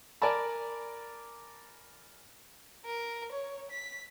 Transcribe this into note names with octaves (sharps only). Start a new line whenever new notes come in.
A#4 D5 G#5 A5 B5
A#4
C#5
B6